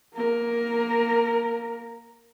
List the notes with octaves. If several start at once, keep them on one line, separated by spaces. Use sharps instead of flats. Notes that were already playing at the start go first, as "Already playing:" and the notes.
A#3 A#4